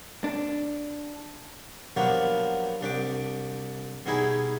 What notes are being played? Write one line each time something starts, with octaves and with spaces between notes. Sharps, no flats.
D4
F3 F#3 A#3 B3 D4 G4
C2 D4 G4 D6
B2 G3 D#4 E4 G#4